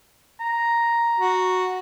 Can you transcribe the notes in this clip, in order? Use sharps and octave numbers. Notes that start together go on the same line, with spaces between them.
A#5
F#4